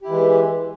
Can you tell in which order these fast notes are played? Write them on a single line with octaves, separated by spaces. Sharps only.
G4 E4 E3 G#3